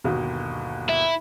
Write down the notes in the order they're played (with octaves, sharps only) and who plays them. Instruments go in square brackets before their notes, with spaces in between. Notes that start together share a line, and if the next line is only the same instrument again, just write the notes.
[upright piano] G1 D#2 B2
[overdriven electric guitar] E4